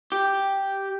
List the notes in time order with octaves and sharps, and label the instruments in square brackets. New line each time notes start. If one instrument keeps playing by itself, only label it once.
[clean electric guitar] G4